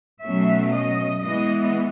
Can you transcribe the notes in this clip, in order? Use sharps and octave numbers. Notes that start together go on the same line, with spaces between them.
B2 F#3 A3 C#4 E5
D#5
E3 G#3 B3 D#5